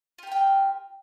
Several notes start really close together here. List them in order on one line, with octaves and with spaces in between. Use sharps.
F4 G4 A#4 G5